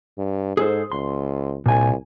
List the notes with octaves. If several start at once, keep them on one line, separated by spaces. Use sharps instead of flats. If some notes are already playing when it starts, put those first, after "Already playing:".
G2
G#2 G#4 A4 C5
C#2 C6
C2 A#2 G#5